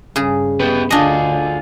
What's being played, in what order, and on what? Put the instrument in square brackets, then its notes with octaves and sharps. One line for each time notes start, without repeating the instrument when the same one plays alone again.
[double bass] G2 [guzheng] C#3 G#4
[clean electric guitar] B3 G4 B4
[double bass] D2 D3 [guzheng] D4 D#5 [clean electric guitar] F4 G#4